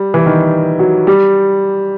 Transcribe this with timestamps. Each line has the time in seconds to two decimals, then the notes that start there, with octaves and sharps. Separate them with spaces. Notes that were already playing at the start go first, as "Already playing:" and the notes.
Already playing: G3
0.14 E3
0.26 D#3
0.79 F#3
1.07 G3